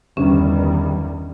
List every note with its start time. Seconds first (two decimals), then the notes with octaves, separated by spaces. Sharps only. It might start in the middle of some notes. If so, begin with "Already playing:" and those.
0.17 G1 E2 D#3 G3 C#4